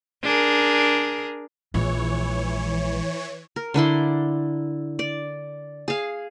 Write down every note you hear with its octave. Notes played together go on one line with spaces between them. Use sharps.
D4 G#4 A#4
A#1 E3 G#3 C#5
A#4
D3 D4 E4 C6
D5
G#4 F5